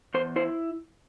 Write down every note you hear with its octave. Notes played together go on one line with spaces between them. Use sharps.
E2 C5
E4 C5